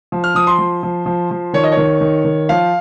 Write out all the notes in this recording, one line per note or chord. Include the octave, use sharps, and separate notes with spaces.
F3
F6
F3 D#6
C6
F3
F3
F3
F3
D#3 C#5
D#5
C#5
D#3
D#3
D#3
F3 F5